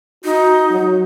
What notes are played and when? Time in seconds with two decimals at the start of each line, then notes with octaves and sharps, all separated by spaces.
0.25 D#4 F#4
0.71 F#3